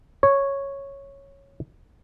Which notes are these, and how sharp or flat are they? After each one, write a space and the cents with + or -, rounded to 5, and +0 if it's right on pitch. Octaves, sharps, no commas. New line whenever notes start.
C#5 -5